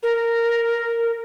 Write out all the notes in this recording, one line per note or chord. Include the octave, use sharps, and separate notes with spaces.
A#4